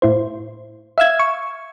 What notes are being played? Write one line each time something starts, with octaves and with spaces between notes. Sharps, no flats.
A2 E4 C5
E5 F5 E6 G#6
C#6